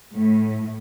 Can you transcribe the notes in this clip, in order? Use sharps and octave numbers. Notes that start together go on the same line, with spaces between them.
A2